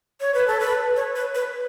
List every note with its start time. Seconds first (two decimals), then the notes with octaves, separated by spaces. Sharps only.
0.20 C#5
0.34 B4
0.47 A4
0.60 B4
0.96 C#5
1.15 B4
1.35 B4